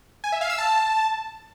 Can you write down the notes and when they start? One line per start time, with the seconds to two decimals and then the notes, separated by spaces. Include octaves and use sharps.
0.24 G#5
0.32 E5
0.41 F5
0.50 E6
0.58 A5